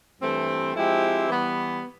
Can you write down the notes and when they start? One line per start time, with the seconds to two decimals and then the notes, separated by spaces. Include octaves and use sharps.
0.21 G2 E3 A3 C4
0.75 F3 G#3 C4 E4 G4
1.29 E3 G3 B3